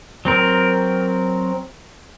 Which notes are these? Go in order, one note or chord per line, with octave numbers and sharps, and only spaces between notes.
F#3 C4 A#4